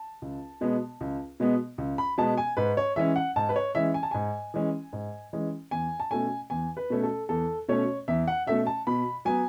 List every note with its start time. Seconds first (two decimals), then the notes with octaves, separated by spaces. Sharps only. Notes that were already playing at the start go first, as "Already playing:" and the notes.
Already playing: A5
0.22 C#2
0.61 B2 G#3 B3
1.01 C#2
1.40 B2 G#3 B3
1.78 C#2
1.98 B5
2.18 B2 G#3 B3 A5
2.38 G#5
2.57 G#2 B4
2.77 C#5
2.96 E3 G#3 C#4 E5
3.16 F#5
3.36 G#2 A5
3.49 B4
3.56 C#5
3.75 E3 G#3 C#4 E5
3.94 G#5
4.03 A5
4.11 G#2 G#5
4.54 E3 G#3 C#4
4.93 G#2
5.33 E3 G#3 C#4
5.71 E2 G#5
6.00 A5
6.11 B2 A3 C#4 G#5
6.50 E2 G#5
6.77 B4
6.90 B2 A3 C#4
7.03 A4
7.29 E2 A4
7.68 B2 A3 C#4 C#5
8.08 E2 E5
8.28 F#5
8.47 B2 A3 C#4 E5
8.67 A5
8.87 B2 B5
9.25 F#3 B3 G#5